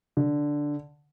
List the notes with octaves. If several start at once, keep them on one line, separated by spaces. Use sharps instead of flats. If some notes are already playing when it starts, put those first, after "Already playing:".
D3